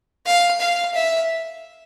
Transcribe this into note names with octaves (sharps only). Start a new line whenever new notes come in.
F5
F5
E5